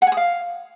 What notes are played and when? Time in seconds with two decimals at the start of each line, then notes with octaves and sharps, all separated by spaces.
0.02 F#5
0.07 G#5
0.12 D#6
0.17 F5